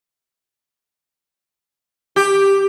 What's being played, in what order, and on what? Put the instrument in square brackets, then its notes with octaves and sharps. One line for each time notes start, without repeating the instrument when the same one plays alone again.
[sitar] G4